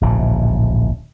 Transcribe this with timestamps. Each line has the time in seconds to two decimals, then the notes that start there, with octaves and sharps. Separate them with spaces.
0.01 D1 A#1 G#2 C#3